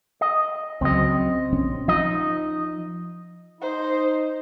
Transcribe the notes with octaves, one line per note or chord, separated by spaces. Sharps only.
D#5
C#2 C#3 F#3 C4 D#5
A#1 F3 C#4
F3 D#4 D#5
D#4 C5